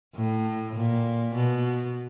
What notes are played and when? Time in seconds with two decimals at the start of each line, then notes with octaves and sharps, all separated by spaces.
0.15 A2
0.75 A#2
1.34 B2